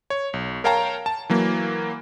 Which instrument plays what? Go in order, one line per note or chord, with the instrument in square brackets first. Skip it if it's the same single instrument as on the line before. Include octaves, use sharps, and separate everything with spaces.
[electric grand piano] C#5
B1
A#4 C#5 F5 G5 A5 A#5
A5
E3 F#3 A#3